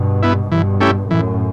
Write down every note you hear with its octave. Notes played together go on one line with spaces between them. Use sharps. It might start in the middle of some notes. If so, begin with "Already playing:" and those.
Already playing: G2 B2
B3 E4
G2 B2 E3
A3 C#4 E4 G4
F#2 A2 E3